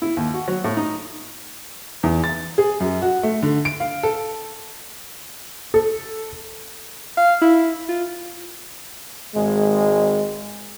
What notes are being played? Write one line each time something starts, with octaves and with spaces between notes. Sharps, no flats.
E4
D#2
F#4
F#3
A2
D#4
E2
A6
G#4
F#2
F#4
A3
D3
D7
F5
A4
A4
F5
E4
F4
G#1 G#3